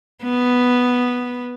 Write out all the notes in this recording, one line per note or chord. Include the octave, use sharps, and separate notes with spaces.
B3